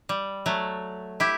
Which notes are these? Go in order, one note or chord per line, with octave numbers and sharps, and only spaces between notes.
G3
F#3 A3
E4 G4